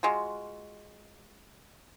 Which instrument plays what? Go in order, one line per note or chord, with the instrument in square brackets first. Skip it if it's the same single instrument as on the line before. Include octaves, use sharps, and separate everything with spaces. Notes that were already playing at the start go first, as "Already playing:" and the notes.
[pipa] G#3 F4 F#4